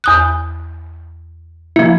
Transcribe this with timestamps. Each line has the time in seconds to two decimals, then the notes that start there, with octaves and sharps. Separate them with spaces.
0.04 E2 D#6 F#6
1.76 F3 A#3 E4